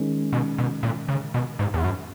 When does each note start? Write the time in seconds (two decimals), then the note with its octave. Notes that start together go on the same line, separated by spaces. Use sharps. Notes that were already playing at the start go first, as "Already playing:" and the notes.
Already playing: D#3 G#3 C#4
0.33 B2
0.58 B2
0.83 A#2
1.09 C#3
1.34 B2
1.59 G#2
1.74 E2
1.84 F#2